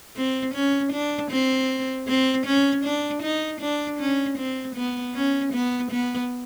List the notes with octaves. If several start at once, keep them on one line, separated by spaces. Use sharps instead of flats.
C4
C#4
D4
C4
C4
C#4
D4
D#4
D4
C#4
C4
B3
C#4
B3
B3